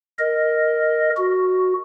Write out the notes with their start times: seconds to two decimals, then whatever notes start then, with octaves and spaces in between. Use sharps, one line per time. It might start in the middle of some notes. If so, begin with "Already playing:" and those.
0.19 A#4 D#5
1.17 F#4